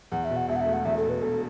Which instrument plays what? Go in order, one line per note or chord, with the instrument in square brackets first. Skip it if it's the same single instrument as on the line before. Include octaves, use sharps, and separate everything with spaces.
[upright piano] E2 [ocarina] F#5
[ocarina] E5
[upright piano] B2
[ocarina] F#5
[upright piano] E1 [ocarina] E5
[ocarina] F#5
E5
[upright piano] A3
[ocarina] F#5
[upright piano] E2 [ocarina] E5
[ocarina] A4
[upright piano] B2
[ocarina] B4
[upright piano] E1 [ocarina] A4